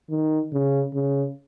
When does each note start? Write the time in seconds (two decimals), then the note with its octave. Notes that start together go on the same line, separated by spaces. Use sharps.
0.10 D#3
0.53 C#3
0.94 C#3